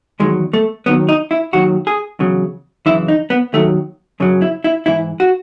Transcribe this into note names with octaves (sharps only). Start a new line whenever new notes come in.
E2 D#3 F#3 G#3
A3
D#2 D#3 F#3 B3
D#4
E4
D#2 D#3 F#3 F#4
G#4
E2 C#3 F#3
F#2 C#3 E3 E4
D#4
B3
D#2 D#3 F#3 A3
F#2 C#3 F#3
E4
E4
G#2 E3 E4
F#4